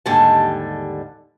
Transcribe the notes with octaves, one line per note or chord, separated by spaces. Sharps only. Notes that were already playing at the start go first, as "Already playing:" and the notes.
D#2 G#2 D3 G3 G#5 A5